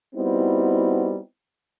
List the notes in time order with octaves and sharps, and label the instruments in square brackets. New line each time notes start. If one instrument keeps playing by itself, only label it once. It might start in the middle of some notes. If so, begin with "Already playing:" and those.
[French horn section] G3 B3 C4 D#4 E4 F#4